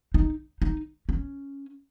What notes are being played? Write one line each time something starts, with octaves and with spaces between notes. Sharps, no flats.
D#4
D#4
C#4